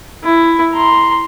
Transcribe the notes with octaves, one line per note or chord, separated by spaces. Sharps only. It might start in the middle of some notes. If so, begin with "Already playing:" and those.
E4
A#5 C6